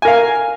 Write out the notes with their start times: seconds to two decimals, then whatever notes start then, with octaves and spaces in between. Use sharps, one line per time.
0.02 G#5
0.05 A#4
0.08 F5